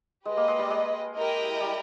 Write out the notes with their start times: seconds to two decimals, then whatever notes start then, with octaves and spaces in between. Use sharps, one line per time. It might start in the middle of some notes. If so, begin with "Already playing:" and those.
0.25 G#3 G4 B4 D#5
0.37 A#3
0.48 G#3
0.59 G3
0.70 G#3
1.15 E4 G4 A#4 D#5 G5
1.60 G3